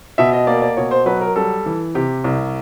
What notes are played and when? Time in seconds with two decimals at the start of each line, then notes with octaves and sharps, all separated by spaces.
0.18 B2 E5
0.33 D#5
0.47 A#3 D5
0.62 D5
0.77 B2 C#5
0.91 C5
1.06 F#3 B4
1.21 A#4
1.36 G3 A4
1.66 E3
1.95 C3 G4
2.24 C2